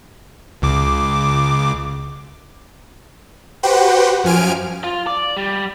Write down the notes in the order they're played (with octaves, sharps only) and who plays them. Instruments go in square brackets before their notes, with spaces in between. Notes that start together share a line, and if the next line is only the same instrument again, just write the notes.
[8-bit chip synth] C#2 C#3 D6
[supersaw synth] F#4 G4 B4 C5 F#5 G5
F#2 F3 G#5 F6 D7
[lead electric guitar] F4
D5
G3